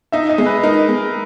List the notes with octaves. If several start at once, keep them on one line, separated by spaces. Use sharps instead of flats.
D#4 E5
D#5
G#3
B4
D#4 A#4
G#3